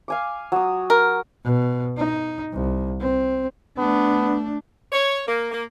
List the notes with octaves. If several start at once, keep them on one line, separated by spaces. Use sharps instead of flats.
F5 G#5 D6
F#3 D#6
A#4
B2
D#4
C2
C4
A3 B3 D4
C#5
A#3
A#3